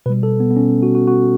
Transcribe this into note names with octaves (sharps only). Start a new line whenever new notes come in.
B2 G3 B4
A4
B3
B3
C#4
F#4
F#4
F#4